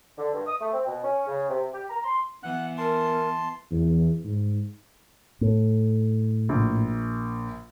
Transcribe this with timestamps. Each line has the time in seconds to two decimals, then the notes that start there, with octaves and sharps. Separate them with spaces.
0.18 D3
0.33 G2
0.47 D#6
0.61 A3
0.73 C4
0.87 B2
1.04 C#4
1.27 C#3
1.49 C3
1.73 G4
1.90 A#5
2.05 C6
2.43 E3 B3 F#5 F#6
2.78 A#4 A5 C6
3.71 E2
4.25 G#2
5.41 A2
6.49 A#1